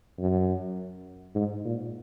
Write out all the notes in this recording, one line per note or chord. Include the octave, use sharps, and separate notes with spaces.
F#2
G#2
A#2